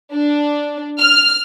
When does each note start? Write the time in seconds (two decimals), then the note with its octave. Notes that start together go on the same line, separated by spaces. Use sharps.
0.14 D4
0.99 F6